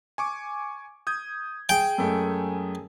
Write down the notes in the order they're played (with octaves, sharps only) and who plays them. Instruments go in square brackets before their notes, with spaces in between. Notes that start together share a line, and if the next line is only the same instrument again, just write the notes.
[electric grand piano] G#5 C#6 D6
D#6 G6 G#6
[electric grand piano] G#4 G#5 [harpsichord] G5
[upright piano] F#2 G#3 A3